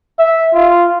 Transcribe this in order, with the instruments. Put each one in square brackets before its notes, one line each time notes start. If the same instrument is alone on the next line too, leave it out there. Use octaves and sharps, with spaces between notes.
[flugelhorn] E5
F4